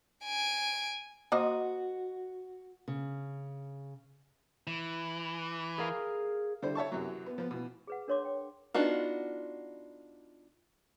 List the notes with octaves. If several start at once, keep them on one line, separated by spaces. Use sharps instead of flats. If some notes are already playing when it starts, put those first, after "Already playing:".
G#5 D7
A#3 F#4 C5 D#5
C#3
E3
G#4 A#4 F5
D3 G3 E4 A4 C5
C#5 E5 A5 C#6
F#2 C3 E3 F#3
B3
F3 B3
B2 E3
G#4 B4 F#5
D4 A#4 C#5 C6 D6
G5
B3 D4 D#4 F4 F#4